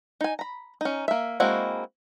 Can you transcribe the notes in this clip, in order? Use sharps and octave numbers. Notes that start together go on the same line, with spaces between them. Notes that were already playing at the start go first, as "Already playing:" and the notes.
D#4 G#5
A#5 B5
C#4 D#4
A#3 E5
G#3 A#3 C4 E4 F#4